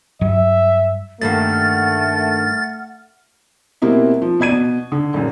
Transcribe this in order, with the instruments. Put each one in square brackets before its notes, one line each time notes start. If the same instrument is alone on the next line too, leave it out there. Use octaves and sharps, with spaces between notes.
[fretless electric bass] G2 F#3 G3 [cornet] E5
[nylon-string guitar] G2 D#3 A#3 [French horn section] A3 [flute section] F#5 F6 [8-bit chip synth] A6
[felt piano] B2 G3 A#3 C4 E4
F3
B2 D5 G#6 D#7
B2
D3
A#1 F#2